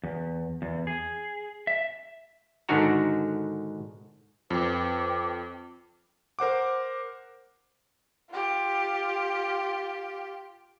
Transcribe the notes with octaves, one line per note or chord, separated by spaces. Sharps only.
E2
E2
G#4
E5
G#2 D3 D#3 D4 F#4 A#5
F2 B4 G5 D6
A#4 C5 F#5 D6
F4 G4